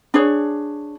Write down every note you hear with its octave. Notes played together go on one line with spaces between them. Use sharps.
D4 G#4 C#5